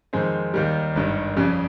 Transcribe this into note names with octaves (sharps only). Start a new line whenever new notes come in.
F2 D#3 G#3 C4
D#2 D#3 G3
G#1 G2 D#3
F2 C#3 G3 C#4